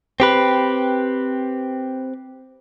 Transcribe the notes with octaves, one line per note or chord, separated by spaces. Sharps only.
C4 G4 B4